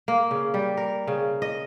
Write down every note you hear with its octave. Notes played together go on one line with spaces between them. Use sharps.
A#3
C#3
G3
A#4
C#3
D#5